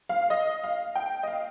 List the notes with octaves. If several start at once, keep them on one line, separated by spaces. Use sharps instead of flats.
F5
D#5
F5
G5
D#5
F5